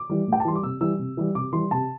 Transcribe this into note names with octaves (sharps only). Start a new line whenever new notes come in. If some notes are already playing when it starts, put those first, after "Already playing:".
Already playing: D6
E3 G3
A2
G5
A5
E3 G3 C6
D6
C3 E6
E3 G3 E6
C3
E3 G3
C3 D6
E3 G3 C6
C3 A5